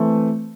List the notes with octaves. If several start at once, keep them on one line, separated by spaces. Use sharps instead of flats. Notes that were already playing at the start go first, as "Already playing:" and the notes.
Already playing: E3 A3 C4